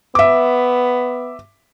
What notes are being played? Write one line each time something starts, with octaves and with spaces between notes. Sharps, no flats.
B3 E5 D6